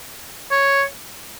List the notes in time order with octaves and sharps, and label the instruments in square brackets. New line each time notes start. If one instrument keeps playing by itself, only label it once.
[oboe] C#5